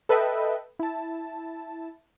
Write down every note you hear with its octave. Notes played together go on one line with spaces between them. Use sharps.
A4 B4 D#5 E5 G5
E4 A5